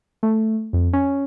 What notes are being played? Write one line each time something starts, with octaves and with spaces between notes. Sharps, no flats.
A3
F2
C#4